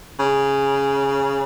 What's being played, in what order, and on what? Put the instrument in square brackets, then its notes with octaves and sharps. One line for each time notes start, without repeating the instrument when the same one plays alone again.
[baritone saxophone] C#3